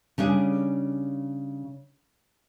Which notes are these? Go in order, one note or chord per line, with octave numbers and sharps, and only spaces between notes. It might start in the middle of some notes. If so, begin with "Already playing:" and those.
C#3 G3 D4 G#4